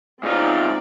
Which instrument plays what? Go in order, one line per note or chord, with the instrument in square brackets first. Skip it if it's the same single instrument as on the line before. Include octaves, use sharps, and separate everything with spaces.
[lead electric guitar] G#2 F4 [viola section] C4 D#4 D5